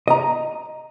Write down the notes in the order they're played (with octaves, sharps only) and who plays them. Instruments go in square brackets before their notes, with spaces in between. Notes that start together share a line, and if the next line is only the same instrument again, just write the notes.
[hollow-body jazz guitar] D#5 A#5